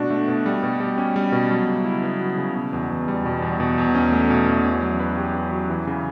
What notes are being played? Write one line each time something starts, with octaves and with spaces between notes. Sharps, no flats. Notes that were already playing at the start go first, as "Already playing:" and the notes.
Already playing: B2 A3 D4 F#4
A3
B2
G3
B2
G4
C#4
G3
B2
F#3
C#3
E4
B3
F#3
C#3
B2
E2
E2
G3
B2
E2
B2
E2
C#4
A3
B2
E2
C#4
F#3
B4
G4
C#4
F#3
E3
C#3